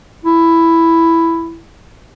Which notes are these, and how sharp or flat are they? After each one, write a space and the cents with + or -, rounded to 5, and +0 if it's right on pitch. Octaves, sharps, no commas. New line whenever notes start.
E4 +5